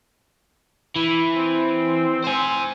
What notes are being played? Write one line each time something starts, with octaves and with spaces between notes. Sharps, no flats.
E3 E4
C4
C5 G#5